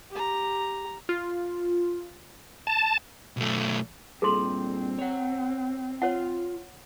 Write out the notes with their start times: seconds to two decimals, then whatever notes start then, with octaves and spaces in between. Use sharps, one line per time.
0.11 G4 A#5
1.09 F4
2.67 A5
3.37 B1 A3
4.22 G2 A#2 C4 G#4 A4 C6
4.99 C#5 F#5
6.02 F4 C#5 F#5